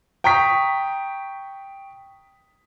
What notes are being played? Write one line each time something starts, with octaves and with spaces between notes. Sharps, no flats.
G5 A#5 C#6 D#6 B6